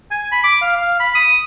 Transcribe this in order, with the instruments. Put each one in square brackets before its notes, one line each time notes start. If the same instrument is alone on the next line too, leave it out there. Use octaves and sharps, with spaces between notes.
[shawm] G#5
B5
D6
F5
F5
B5
D#6